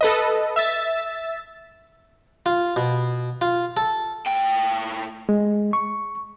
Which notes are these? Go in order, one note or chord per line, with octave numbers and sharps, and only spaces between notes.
A4 B4 D#5
E5 E6 A6
F4
B2
F4
A4
A2 G5
G#3
C#6